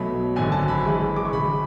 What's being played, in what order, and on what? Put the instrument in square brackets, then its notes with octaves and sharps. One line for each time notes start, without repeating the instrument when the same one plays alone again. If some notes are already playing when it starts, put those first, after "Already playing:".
Already playing: [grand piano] B1 B2 F#3 A3 B5
G#1 F#2 D3 G#5
A5
B5
F#2 E3 G#3
D6
C#6
D2 C#3 G#3 B5